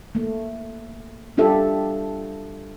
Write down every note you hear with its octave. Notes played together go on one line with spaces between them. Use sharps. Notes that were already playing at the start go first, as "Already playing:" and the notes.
A3 A#3
G3 D4 F4 G4 A4 E5